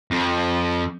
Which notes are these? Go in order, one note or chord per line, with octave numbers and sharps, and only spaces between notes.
F2